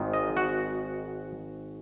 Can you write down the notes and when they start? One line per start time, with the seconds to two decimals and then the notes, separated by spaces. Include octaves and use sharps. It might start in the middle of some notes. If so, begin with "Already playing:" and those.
Already playing: G#1 G#2 D#3
0.13 D#5
0.37 F#4